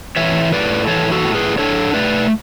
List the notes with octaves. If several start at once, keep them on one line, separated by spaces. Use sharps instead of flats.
E3 C#5 E5
A2 B4 D5
E3 A4 C#5
F#4 A4
A2
G#4 B4
D4 A4 C#5
A3 B4 D5